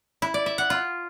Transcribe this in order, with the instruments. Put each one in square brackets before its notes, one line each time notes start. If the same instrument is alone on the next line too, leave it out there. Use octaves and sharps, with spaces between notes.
[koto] E4
D5
E5
F#5
F4